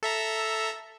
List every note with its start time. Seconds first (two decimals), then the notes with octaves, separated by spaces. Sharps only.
0.03 A4 E5 A#5